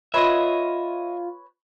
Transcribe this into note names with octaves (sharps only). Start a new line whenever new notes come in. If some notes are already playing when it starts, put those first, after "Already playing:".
F4 B4 C#5 D#5 E5 C6